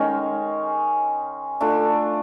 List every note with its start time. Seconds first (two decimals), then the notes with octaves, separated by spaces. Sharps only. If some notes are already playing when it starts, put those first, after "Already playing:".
Already playing: D#3 G#3 C#4
1.60 A3 D4 F4